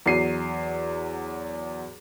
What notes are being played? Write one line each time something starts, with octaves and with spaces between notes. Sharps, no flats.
E2 F#3 C7 D#7